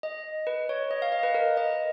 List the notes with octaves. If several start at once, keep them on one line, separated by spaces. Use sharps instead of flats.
D#5
B4
C#5
D#5
F5
D#5
B4
A#4
D#5